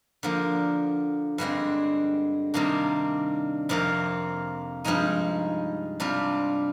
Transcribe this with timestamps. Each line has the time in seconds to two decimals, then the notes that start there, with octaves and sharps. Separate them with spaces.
0.23 D3 F3 A#3
1.38 G2 D3 G#3 C4
2.54 C3 D#3 G3 A#3 D4
3.69 F2 C3 F3 A#3 F4
4.84 G2 F3 G#3 D#4
6.00 C3 G3 D4 F4